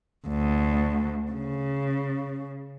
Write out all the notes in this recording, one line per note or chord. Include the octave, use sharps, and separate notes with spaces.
D2
C#3